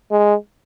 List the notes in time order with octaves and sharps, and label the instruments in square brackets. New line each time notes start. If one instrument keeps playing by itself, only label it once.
[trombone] G#3